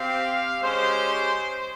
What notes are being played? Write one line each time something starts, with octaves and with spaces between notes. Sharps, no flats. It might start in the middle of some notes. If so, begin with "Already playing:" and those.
Already playing: C4 G4 F5
G#3 C#4 G4 C5